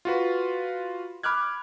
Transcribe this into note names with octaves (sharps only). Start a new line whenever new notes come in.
F4 F#4 B4
B5 D6 F6 F#6 G#6